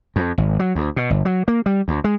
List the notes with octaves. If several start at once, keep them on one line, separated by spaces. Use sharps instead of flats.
F2
G#1
F#3
D2
B2
G1
F#3
A#3
G3
D2
G#3